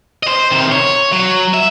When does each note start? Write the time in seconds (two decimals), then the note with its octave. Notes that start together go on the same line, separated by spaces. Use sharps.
0.23 C5 D#5
0.51 C3 D#3
0.72 C#5
1.12 F#3
1.54 E5